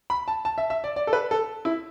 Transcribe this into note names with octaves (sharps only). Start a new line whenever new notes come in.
B5
A5
A5
E5
E5
D5
D5
A4
B4
A4
E4